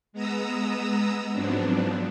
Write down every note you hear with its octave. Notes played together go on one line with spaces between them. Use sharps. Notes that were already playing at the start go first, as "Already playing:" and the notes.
G#3 B3 A#5 D#6 E6
G#2 F3 F#3 B3 C4 D4